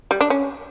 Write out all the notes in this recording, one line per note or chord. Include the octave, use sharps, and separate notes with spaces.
G3
D4
C#4